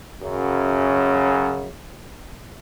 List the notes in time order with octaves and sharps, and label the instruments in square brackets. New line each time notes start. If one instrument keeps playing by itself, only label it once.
[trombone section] F#2 C#3